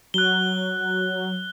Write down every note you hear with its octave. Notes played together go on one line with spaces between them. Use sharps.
F#3 F#6 G7